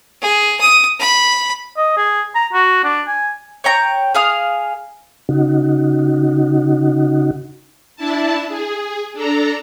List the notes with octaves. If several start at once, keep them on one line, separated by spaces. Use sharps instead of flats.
G#4
D#6
B5
D#5
G#4
A#5
F#4
D4
G#5
C#5 G5 A#5
G#4 F5 D#6
C#3 D#4 F#4
D4 E4 A5
G#4
D4 A4 A#5